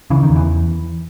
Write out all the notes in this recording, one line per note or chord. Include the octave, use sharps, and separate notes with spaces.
C#3 E3
D#3
E2
E3